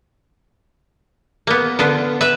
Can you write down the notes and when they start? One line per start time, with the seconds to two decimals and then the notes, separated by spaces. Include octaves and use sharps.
1.47 A#3 B3
1.79 D3 B3 F4
2.21 B4 E5